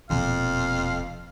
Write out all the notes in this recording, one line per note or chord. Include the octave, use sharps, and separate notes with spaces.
E1 F2 A#2 F5